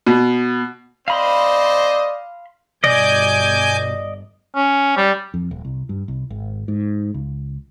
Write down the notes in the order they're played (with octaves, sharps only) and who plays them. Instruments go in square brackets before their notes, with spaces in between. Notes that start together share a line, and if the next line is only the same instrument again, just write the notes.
[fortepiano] B2
[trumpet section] C4 C5 D#5 [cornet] D5 [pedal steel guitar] F5 B5 C6
[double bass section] G1 [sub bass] B2 [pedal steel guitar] D5 D#5 [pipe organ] G#5 D6 G6
[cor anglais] C#4
G3
[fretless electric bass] F2
D#1
C2
G2
C2
G#1
G#2
C#2